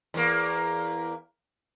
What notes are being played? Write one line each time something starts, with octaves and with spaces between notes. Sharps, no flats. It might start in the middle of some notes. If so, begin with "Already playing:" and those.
E2 A#3